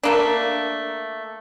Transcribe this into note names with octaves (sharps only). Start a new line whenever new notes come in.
A3 A#3 D4